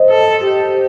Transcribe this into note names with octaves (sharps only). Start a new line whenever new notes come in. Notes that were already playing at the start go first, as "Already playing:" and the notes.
Already playing: C5 D#5
A4
G4